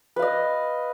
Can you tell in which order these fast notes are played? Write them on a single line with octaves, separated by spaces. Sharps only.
B4 F5 D#5